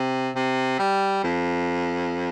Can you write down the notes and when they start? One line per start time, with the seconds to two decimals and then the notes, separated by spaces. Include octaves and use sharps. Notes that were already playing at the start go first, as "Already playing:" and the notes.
Already playing: C3
0.35 C3
0.79 G3
1.24 F2